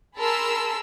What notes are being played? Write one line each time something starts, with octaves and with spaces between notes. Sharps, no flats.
G#4 A#4 A5 B5 C6 E6